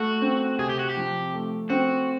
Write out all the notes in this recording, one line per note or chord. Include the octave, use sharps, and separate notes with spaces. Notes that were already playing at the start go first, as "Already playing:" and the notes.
Already playing: A3 F#4
C4
C3 G#4
G4
F#4
G4
F3
A3
C4 F#4